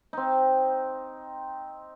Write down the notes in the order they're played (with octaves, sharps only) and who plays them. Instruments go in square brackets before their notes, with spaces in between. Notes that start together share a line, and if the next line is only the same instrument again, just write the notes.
[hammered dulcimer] C4 D#4